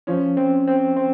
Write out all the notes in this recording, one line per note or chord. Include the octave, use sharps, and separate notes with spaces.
F3 C#4
C4
C4
C4